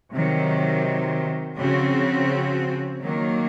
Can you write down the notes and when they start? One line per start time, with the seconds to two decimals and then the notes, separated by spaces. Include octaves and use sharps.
0.15 C3 D#3 F#3
1.58 C#3 F3 C4 F#4
3.01 D#3 F#3 A#3